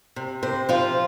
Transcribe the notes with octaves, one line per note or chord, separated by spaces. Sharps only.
C3
C3 C5
F3 F4